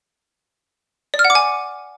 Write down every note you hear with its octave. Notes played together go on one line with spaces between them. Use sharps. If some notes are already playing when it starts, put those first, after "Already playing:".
D5
F6
F#5
D6
G#5